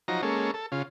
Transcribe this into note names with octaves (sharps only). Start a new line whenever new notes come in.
F3 F#3 D#4 A#5
G#3 A#3 C#4 A4
A4
C#3 F4